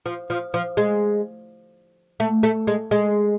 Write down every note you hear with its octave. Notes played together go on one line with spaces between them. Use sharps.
F3
F3
F3
G#3
A3
A3
G#3
G#3